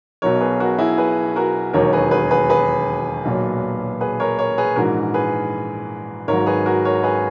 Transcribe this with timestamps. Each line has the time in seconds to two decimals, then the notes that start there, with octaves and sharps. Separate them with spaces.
0.22 B1 B2 F#3 A#4 C#5
0.41 G#4 B4
0.60 F#4 A#4
0.78 E4 G#4
0.98 G#4 B4
1.36 F#4 A#4
1.73 E1 D#2 D#3 F#3 A#4 C#5
1.93 G#4 B4
2.11 G#4 B4
2.31 G#4 B4
2.49 G#4 B4
3.25 B1 A#2 F#3
4.01 G#4 B4
4.20 A#4 C#5
4.39 A#4 C#5
4.58 G#4 B4
4.76 A#1 G#2 E3 F#4 A#4
5.14 G#4 B4
6.27 G#1 G#2 F#3 A#4 C#5
6.46 G#4 B4
6.66 F#4 A#4
6.85 A#4 C#5
7.03 G#4 B4